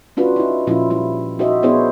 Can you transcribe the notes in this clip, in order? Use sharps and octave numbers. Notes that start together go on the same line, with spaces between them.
C#4 D4 F4 F#4 B4
D#4 E4
A#2 F3 C#4 E4 F4
G3 E4
D#4 F#4 A#4 C5 D#5 E5
B3 D4 E4 G#4 C5 C#5